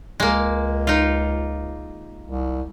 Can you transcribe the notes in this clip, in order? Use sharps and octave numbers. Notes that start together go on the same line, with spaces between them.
C#2 G#3 A#3
D#4 F4
C2